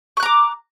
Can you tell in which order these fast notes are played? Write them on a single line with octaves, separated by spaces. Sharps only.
C#6 F#6 A#5 D6